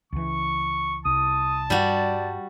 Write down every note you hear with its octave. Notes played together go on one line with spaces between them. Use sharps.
C#2 E3 C#6
C2 A5 D#6
G2 G3 F#4 D5